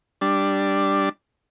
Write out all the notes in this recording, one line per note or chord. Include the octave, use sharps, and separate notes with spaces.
G3 D4